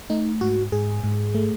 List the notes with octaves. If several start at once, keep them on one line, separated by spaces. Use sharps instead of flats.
A3 D#4
G#2 F#4
G#2 G#4
G#2
A3